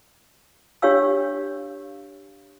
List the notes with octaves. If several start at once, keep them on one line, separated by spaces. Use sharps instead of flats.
D4 G4 C#5 F5 E6